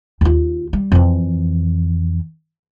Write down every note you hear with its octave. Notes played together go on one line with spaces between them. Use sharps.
D#2 F4
G3
F2 E3